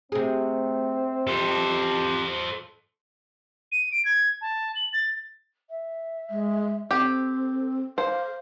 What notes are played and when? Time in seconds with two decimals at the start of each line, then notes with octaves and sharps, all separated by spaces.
0.12 C3 A3 C4 G#4
1.27 F2 G4 A4 C5
3.72 D#7
3.92 D7
4.05 G#6
4.41 A5
4.76 F#7
4.93 A6
5.70 E5
6.30 G#3
6.91 C4 G4 A4
7.98 A4 C5 F5